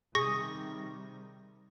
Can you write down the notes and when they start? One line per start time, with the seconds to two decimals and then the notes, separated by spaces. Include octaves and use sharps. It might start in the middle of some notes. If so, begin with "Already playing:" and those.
0.15 C3 D#3 G3 G#4 C#6 A#6